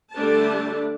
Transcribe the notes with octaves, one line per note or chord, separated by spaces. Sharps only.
D3 G3 A3 D4 A5